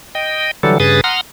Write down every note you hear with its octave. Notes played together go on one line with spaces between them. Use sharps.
D#5 G5
D3 E3 F#3 G3 A4
G2 C#3 G#4 B4 D#6 A6
F#5 A#5 C6 D#6 F6